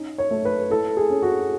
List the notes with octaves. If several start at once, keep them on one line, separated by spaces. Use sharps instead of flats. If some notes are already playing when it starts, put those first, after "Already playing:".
Already playing: C#4 D#4
C#5
A3
B4
E4 A4
G#4
C#4
F#4